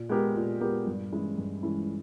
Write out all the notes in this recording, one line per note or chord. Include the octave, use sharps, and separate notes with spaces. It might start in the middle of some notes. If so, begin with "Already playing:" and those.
Already playing: A#2
G#3 B3 G4 A#4
A#2
G#3 B3 G4 A#4
G2
E3 G#3 C#4 E4
G2
E3 G#3 C#4 E4